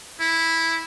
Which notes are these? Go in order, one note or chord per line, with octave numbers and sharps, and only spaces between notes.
E4